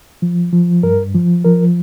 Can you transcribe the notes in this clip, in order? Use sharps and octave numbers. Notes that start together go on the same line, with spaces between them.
F3
F3
G2 A#4
F3
F3 A#4